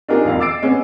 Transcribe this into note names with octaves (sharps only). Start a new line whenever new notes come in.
D4 D#4 F4 G4 G#4 A#4
E1 F2 B2 F5
D6 E6 A6 C7 D7
G#3 B3 C#4